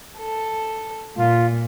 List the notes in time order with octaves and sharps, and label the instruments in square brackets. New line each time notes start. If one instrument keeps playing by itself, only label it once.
[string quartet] A4
[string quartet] A#2 [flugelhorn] F4